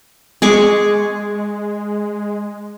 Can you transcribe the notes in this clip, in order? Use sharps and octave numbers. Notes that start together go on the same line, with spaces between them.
G#3 G#4 C#6 D6